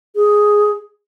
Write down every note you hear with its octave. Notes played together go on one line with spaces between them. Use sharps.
G#4